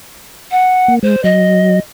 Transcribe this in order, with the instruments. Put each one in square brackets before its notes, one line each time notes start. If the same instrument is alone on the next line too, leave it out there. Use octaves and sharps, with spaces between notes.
[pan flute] F#5
[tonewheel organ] A#3
[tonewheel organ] G#3 [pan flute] C5
[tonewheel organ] F#3 [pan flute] D#5